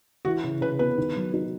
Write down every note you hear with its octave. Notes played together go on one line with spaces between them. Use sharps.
E3 F#4
C#3
C#3 B4
B3 B4
D#3
F#3
D#4